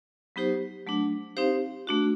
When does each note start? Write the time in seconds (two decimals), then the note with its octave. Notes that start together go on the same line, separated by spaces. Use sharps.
0.36 F#3 B3 D#4 G4 C5
0.87 F#3 A3 D4
1.37 C4 D#4 G4 C5 F5
1.87 A3 D4 F#4